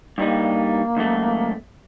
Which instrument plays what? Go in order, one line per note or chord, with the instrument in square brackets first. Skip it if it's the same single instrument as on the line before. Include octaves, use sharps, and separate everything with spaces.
[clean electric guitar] G2 G3 D#4 [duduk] A#3
[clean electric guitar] C#2 F#2 A3